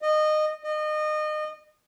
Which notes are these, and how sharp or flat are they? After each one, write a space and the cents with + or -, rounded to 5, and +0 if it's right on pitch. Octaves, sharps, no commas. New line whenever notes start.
D#5 -20
D#5 -30